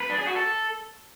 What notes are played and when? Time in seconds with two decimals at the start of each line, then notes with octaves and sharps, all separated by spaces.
0.01 B4
0.09 D4
0.18 G#4
0.27 F#4
0.36 A4